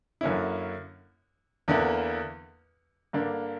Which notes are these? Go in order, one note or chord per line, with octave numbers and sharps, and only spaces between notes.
F#2 D3 A#3 C#4 E4
E2 D3 A#3 E4
G2 D3 A#3 D4